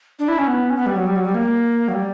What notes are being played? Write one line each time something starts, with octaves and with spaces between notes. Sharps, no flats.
D4
E4
C#4
B3
C#4
B3
G3
F#3
G3
F#3
G3
A#3
F#3
G3